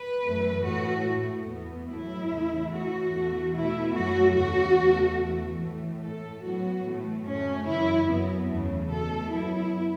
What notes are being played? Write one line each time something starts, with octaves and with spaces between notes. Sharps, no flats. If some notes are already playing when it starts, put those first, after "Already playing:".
Already playing: B4
F#2 E3 A3
A2 A3 F#4
A2 A3
E2 E3 B3
A2 F#3 A3 E4
E2 C#3 A3
A2 E3 A3 F#4
E2 E3 A3
B2 A3 E4
F#2 F#3 A3 F#4
E2 C#3 A3 F#4
E2 C#3 A3
E2 E3 A3
A2 E3 A3
A2 A3 A4
A2 F#3 B3 F#4
A2 E3 A3
F#2 C#3 A3 C#4
F#2 C#3 E3 E4
F#2 F#3 B3
E2 C#3 A3
B2 A3 A4
F#2 F#3 B3 E4